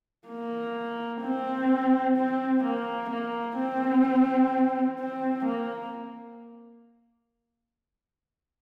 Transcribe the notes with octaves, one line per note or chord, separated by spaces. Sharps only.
A#3
C4
C4
A#3
A#3
C4
C4
A#3